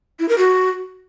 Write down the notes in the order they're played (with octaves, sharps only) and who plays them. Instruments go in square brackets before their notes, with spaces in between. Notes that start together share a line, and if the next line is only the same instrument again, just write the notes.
[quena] E4
A#4
F#4